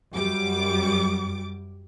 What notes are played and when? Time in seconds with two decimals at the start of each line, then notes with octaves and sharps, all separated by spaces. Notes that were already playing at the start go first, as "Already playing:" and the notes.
0.14 F#2 G3 D6